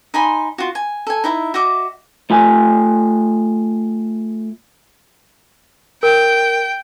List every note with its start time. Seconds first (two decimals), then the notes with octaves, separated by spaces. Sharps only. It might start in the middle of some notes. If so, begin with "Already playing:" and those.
0.14 D#4 G#5 B5 C6
0.58 F4 F#4
0.75 G#5
1.07 A4 G#5
1.24 D#4 E4 E5
1.54 F#4 D#5 E5 D6
2.30 A3 F4 G#5
6.03 A#4 G5